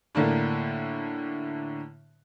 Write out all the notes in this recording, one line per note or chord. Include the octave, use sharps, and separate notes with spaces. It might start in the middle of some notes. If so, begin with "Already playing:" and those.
A2 D3 A#3 D4